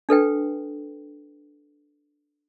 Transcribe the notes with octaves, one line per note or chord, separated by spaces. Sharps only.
D4 A4 B4 G5